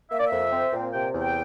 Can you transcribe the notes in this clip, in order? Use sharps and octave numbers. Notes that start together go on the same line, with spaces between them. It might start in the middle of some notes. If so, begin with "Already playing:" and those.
A#3 E5
D5
F2 E5
C4
A#2
C3 G5
E2
G5